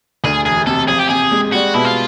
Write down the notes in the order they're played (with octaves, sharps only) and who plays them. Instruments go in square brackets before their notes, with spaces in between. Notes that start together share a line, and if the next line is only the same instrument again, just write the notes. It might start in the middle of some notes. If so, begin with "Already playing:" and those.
[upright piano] D2 [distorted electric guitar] G#4
[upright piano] E1 [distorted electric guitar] G#4
[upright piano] C3 [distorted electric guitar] A4
[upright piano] F3 [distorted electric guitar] G#4
[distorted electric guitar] G4
[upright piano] C3 [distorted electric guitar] G#4
[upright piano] G#3
[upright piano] G3 [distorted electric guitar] F#4
[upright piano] B2 [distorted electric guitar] E4
[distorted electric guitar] F4